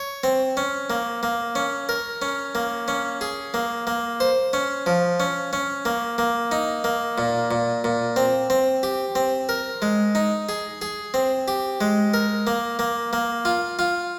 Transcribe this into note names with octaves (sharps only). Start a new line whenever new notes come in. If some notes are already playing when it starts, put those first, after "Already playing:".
Already playing: C#5
C4
C#4
A#3
A#3
C#4
A#4
C#4
A#3
C#4
G#4
A#3
A#3
C5
C#4
F3
C#4
C#4
A#3
A#3
D#4
A#3
A#2
A#2
A#2
C4
C4
G4
C4
A#4
G#3
D#4
G#4
G#4
C4
G4
G#3
A#4
A#3
A#3
A#3
F4
F4